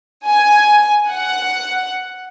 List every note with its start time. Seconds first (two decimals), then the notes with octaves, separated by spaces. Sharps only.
0.27 G#5
1.10 F#5